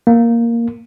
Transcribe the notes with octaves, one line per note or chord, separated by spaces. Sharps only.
A#3